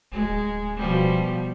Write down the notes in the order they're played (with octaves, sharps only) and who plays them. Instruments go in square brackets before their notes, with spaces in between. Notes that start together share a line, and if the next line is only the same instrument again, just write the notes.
[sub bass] D1 [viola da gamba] G#3
[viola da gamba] B2 F3 G3